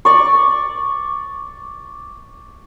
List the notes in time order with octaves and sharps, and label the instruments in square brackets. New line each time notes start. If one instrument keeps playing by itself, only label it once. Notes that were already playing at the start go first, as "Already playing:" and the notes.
[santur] D5 C#6